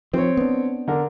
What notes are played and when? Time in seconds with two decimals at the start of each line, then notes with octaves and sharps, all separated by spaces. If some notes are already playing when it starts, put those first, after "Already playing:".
0.14 F3 C4 C#5
0.37 B3 D4
0.88 D3 A#4